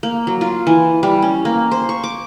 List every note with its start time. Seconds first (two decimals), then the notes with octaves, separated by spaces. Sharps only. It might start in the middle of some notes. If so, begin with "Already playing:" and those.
0.03 A#3
0.27 F#3
0.41 F4
0.67 E3
1.03 G3
1.22 C#4
1.45 A#3
1.71 C5
1.89 C#6
2.04 D6